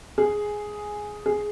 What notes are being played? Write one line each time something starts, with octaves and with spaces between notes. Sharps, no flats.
G#4
G#4